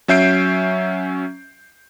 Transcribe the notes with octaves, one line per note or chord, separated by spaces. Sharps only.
F#3 C#4 E5 G6 C7 D7